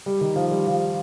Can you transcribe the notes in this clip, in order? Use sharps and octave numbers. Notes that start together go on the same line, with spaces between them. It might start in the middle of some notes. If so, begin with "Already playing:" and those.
G3
D#3
F3
G3
F3